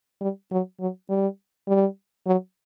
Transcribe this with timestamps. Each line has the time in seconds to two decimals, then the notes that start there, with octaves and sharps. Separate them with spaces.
0.21 G3
0.51 F#3
0.80 F#3
1.10 G3
1.68 G3
2.27 F#3